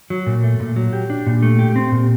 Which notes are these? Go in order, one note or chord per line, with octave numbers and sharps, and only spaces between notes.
F#3
A#2
A3
A#2
F#3
G4
D4
A#2
A3
G4
C4
A#2